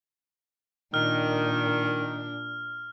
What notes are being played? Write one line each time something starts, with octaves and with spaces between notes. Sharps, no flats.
A#2 D#3 D4 F6